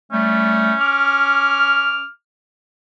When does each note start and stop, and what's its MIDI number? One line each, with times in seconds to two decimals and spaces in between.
0.12 0.72 55
0.12 0.72 57
0.12 2.04 61
0.80 2.08 86
0.80 2.08 89